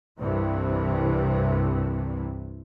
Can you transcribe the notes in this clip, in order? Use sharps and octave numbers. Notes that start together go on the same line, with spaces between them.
C2 G2 C3 E3